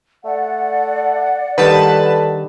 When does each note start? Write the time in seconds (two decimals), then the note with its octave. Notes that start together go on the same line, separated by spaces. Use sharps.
0.25 A3 D5 F#5
1.58 D3 D#3 G3 B4 A5